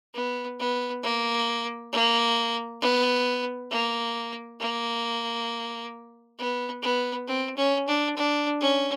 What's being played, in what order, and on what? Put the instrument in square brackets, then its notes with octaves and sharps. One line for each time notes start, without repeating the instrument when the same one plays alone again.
[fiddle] B3
B3
A#3
A#3
B3
A#3
A#3
B3
B3
C4
C#4
D4
D4
C#4